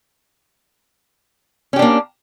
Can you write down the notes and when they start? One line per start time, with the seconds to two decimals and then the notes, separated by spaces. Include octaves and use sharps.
1.73 C#4
1.76 G4
1.79 D4
1.82 A#3